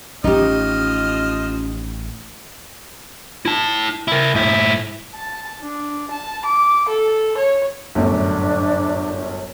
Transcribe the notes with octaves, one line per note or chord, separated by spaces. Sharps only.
A1 F3 C#4 D#4 G4 D#5 F6
E4 A5
E4 A#4
G#2 E4
A5
D4
A5
D6
A4
C#5
G1 F#2 A2 D4